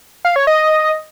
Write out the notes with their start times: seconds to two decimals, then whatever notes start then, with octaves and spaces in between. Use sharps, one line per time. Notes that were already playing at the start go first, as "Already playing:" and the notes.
0.25 F5
0.36 C#5
0.47 D#5